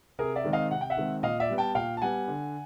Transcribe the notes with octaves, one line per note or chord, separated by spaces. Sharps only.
C3 G#4 A#4
D5 E5
D#3 G#3 C4
D#5 F5
C3 F#5
G5
E5 F#5
D#3 G#3 C4
A#2 D#5 F5
D5 E5
G3 B3
G5 A5
A#2 F5 G5
A5
G3 B3 F#5 G#5
D3